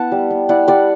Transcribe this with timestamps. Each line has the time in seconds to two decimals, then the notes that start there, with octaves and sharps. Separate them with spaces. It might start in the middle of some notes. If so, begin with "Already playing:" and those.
Already playing: B3 E4 F#5 A5
0.12 G3
0.31 B3
0.49 E4 D5 F#5
0.68 G3 D5 F#5